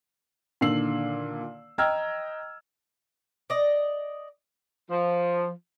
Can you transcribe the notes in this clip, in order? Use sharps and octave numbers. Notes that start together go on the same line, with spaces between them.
A#2 D3 D#3 E6 C7 F#7
D#5 G5 A#5 E6 F6 G#6
D5 D#5
F3